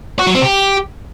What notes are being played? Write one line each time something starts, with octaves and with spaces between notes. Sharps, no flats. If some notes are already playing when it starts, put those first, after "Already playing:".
F#4
F#3
C4
G4